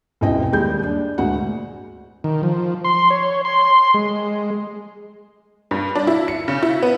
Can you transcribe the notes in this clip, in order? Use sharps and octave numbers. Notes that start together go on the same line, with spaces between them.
E1 C#2 C4 E4 D#5 G5
D#2 G3 G#3 G#4 G6
D4
D2 A#2 G#3 F#4 F#5
D#3
F3
C6
C#5
C6
G#3
G2
D4
E4
C#7
C#3
E4
B3